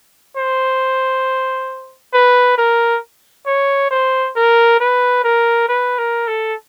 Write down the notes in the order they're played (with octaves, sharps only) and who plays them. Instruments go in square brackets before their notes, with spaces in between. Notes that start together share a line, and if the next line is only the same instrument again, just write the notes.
[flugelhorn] C5
B4
A#4
C#5
C5
A#4
B4
A#4
B4
A#4
A4